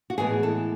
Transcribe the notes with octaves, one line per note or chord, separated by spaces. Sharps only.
F#4
A2 E3 G#3 B3 G#4
A4